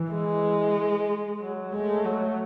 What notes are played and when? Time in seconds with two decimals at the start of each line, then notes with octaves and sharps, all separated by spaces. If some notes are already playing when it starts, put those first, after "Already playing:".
Already playing: E3
0.12 G#3
1.41 F#3
1.73 G#3 A3
2.05 F#3